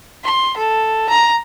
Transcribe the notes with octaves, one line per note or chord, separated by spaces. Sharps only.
C6
A4
A#5